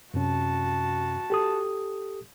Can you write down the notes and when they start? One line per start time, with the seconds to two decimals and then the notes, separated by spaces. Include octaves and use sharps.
0.14 F#2 C3 C#4 F#4 A5
1.30 G4 A4 D#6